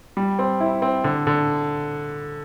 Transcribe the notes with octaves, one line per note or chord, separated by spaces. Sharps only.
G3
C4
E4
C4
D3
D3